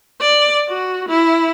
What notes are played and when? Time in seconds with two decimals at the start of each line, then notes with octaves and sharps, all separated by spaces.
0.21 D5
0.69 F#4
1.09 E4